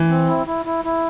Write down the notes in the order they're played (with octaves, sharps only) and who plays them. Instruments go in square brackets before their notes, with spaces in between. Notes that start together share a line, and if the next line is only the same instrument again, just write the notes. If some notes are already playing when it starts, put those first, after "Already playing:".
Already playing: [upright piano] E3
[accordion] C4
E4
E4
E4
E4